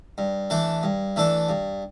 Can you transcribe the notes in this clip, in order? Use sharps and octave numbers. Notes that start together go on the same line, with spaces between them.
G2
E3 A3 D4 A4
G2
E3 A3 D4 A4
G2